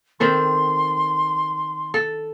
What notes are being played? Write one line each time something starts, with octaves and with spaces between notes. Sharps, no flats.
D#3 C4 A4 C6
A4